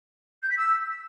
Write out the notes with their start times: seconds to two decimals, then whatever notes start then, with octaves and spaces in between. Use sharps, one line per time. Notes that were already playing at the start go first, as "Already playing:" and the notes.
0.42 G6
0.50 B6
0.57 E6